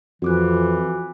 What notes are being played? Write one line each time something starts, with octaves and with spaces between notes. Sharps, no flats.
F2 E3 F#4 D6 F#6